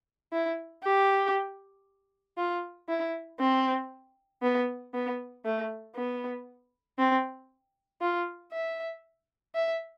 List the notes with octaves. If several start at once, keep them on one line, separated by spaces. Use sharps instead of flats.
E4
G4
F4
E4
C4
B3
B3
A3
B3
C4
F4
E5
E5